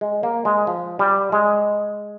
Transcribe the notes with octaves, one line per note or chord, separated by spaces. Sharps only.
G#3
A#3
G#3
F3
G3
G#3